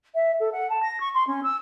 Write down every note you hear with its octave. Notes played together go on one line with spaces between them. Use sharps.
E5
A4
F#5
A5
A#6
C#6
C6
C#4
E6